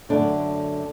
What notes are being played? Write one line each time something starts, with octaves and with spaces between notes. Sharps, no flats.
F#2 D3 A3 D4